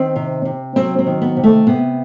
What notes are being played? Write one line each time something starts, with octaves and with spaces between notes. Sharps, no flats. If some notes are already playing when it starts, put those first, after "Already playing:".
Already playing: D#3 C4
C3
C3
F#3 C4
C4
D#3
B3
C3
A3
C3 B3